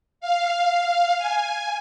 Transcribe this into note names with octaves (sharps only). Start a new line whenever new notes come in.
F5
G#5